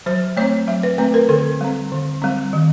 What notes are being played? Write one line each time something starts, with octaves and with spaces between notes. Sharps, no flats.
F#3 C5
A3 C4 C#5
F#3 E5
B4
A3 C4 B4
A#4
D3 A4
G3 C4
D3
G3 C4
D#3